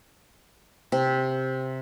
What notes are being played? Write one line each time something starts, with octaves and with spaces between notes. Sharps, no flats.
C3